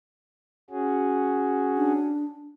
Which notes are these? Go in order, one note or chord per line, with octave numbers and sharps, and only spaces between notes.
C#4 F#4 G#4
D4